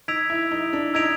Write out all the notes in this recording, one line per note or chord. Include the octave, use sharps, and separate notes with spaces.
D#4 E6 G#6 B6 D7 F7
E4
D#4
D4
D#4 E6 G#6 B6 D7 F7